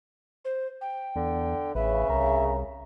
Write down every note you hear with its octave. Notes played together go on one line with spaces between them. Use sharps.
C5
G5
E2 D3
A1 C#3 B4 E5
C2 A#4